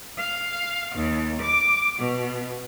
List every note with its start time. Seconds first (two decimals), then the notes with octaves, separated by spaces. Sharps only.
0.16 F5
0.94 D#2
1.41 D6
1.98 B2